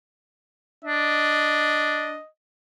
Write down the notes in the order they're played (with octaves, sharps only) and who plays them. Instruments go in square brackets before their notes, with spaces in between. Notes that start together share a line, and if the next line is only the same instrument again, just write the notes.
[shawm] D4 [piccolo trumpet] D#5